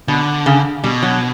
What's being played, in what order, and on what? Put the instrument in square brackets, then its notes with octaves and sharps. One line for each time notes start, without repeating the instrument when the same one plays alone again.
[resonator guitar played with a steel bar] B2 [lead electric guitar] D3
[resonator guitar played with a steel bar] C#3
[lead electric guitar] B2 [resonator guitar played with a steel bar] G3
[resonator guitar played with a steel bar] F#3